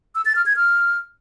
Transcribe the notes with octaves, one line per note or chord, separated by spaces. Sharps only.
E6
A6
F6
G#6
F6